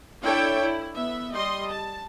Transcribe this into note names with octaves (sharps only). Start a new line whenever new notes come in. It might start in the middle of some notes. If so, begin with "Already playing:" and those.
D4 E4 A4 C#5 E5 G5
E4
B3 E5
G3 D#5 C6
A5